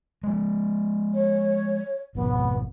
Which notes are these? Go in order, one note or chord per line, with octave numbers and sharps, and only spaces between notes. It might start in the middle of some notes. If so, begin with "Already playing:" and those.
F3 G#3
C#5
G#1 F2 B2 B3